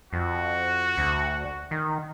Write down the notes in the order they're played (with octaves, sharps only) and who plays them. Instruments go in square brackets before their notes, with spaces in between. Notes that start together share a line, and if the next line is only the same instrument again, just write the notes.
[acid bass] F2 [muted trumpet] F#4
[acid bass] D2
D#3